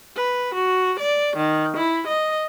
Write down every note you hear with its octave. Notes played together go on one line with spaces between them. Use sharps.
B4
F#4
D5
D#3
E4
D#5